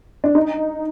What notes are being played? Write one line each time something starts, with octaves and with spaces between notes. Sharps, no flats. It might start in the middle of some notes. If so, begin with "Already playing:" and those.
D4
D#4